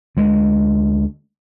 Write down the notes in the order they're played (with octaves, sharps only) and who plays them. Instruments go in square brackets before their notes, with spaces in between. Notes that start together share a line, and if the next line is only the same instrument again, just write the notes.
[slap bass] D2 G#3